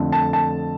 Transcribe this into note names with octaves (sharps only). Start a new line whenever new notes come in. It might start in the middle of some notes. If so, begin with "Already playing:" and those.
Already playing: F2 D3 A3
A5
A5